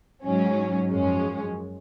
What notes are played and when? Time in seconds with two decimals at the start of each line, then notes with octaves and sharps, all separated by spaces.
0.25 G#2 F#3 C#4
0.90 F#2 F3 G#3 C#4